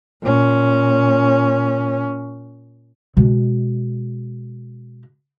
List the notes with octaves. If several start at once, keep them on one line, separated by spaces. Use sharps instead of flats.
A#2 C#4
B2 G#3